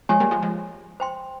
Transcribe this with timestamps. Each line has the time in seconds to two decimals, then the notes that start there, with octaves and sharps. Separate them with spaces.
0.09 F3 G#3 G4 C#5 G#5
0.20 G3 A#3
0.31 F3 G#3
0.42 F3 G#3
1.00 C5 G5 C6